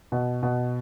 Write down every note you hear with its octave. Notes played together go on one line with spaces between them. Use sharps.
B2
B2